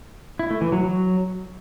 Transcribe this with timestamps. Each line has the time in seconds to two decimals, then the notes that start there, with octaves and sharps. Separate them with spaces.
0.39 E4
0.50 A3
0.61 E3
0.72 F#3
0.83 F#3